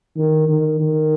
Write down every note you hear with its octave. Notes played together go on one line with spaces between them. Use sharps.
D#3
D#3
D#3